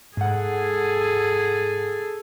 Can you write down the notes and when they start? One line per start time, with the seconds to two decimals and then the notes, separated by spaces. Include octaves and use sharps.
0.17 G#2 G#4 A4 F#5